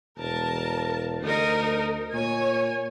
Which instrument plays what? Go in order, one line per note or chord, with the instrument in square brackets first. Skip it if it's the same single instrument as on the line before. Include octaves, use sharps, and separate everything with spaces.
[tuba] E1 [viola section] A#4 A5
[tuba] D2 [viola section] D#4 A#4
[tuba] A#2 [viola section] C#5 G#5